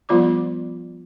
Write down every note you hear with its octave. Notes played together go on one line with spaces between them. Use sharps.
F3 G3 B3 F4 D5 D6